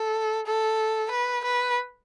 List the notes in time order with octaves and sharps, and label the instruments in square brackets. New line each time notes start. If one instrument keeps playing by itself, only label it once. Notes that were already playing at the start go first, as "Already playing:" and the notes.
Already playing: [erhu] A4
A4
B4
B4